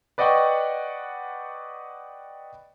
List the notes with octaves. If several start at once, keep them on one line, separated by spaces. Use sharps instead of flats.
B4 D5 D#5 F#5 G5 C#6